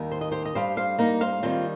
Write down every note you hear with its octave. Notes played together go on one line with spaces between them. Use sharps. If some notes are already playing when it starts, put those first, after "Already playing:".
Already playing: D#2 D#3 G3
C5
D#5
G4 C5
D#5
G2 G3 C5 F5
C5 F5
A#3 D#4
C5 F5
D#2 D#3 G3 C4 F4